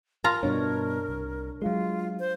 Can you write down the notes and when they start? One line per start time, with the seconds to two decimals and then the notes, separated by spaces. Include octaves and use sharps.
0.24 F4 A#4 A#5
0.43 G2 B2 D4 C#5
1.09 C2
1.62 F#3 G#3 F4
2.19 C5